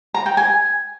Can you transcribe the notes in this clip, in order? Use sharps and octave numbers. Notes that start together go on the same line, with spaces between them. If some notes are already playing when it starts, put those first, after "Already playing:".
A#5
G5
G#5